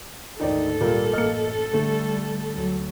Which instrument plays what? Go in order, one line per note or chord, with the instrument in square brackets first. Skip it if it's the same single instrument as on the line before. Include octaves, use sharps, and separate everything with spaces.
[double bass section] D2 G#2 [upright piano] D#3 D#4 D5 [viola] A4
[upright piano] A#2 G3 A#3
[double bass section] A1 F#2 [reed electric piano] A#3 D#5 [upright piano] F6 C#7
[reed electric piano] D3 [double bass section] G3 [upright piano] A3
[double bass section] D2 F#3